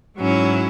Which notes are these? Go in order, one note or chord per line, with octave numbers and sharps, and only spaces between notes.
G#2 F#3 C#4 E4